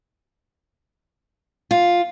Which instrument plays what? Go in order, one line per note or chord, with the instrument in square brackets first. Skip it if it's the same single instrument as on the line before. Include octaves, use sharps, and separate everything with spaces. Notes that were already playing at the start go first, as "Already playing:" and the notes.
[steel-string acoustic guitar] F4